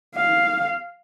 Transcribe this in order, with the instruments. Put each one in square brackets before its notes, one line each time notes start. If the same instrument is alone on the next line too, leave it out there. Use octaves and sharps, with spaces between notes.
[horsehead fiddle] F5